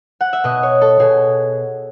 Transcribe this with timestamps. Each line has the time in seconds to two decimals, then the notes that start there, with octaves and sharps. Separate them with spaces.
0.21 F#5
0.33 E5
0.44 B2 D#5
0.63 C#5
0.81 A4
1.00 B2 G#4